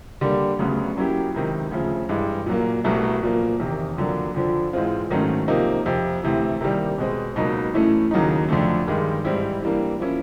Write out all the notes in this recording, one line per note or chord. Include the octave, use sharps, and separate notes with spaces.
D3 G3 A#3
D2 C#3 F#3 B3
F#3 A#3 C#4 E4 G4
C#2 C3 D#3
D2 C#3 F3
G2 E3 G#3
A#2 F#3 A#3
C2 B2 F#3 A3
A#2 F3 A#3
E2 C3 D#3
F2 D3 F#3 A#3
F2 D3 F3
G#2 E3 G#3 C4 F4
G#2 D#3 F#3 A3 C#4
C3 F3 A#3 D#4
F2 C3 F3
D2 C3 E3
C3 D#3 G3 A#3
B2 G#3 C4
C#2 B2 F#3 A#3 D#4
A2 E3 A3 C#4
D#2 C#3 F#3 A#3 D#4
F2 D3 F3 A3
G2 D#3 G#3
G#2 E3 G3 C4 E4
E3 G3 A#3 D4
F3 A#3 C#4 E4